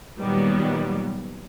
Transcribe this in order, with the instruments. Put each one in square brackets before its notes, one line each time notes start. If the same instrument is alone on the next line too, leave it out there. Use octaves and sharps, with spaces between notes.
[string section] A#2 D#3 F#3 G3 B3